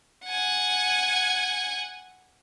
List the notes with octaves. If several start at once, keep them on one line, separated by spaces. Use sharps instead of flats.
F#5 G#5